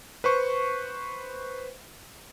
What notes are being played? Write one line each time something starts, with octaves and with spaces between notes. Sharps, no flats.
B4 C5 C#6